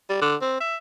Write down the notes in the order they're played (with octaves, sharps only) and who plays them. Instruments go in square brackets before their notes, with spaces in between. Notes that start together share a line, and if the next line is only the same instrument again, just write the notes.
[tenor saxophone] G3
D3
C4
E5